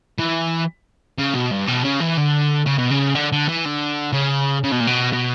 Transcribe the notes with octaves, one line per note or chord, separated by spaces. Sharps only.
E3
C#3
B2
G2
B2
C#3
E3
D3
C#3
B2
C#3
D3
D3
E3
D3
C#3
C#3
B2
A#2
B2
B2